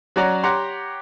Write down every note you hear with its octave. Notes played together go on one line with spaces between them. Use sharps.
F#3 C#4 F#4 D5 A#5
G4 C#5 F#5 A#5 C6